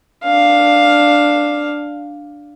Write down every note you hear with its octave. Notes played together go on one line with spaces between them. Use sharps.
D4 F5